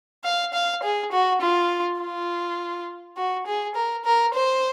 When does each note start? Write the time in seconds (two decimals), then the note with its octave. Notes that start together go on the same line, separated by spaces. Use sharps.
0.24 F5
0.54 F5
0.83 G#4
1.12 F#4
1.41 F4
2.00 F4
3.17 F#4
3.47 G#4
3.75 A#4
4.05 A#4
4.34 C5